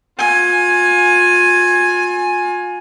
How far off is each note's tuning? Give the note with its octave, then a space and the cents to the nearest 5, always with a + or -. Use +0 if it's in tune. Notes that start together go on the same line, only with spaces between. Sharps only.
F4 +35 G#5 +0